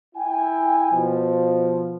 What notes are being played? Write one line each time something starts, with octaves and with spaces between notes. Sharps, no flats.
E4 G5 G#5
B2 F3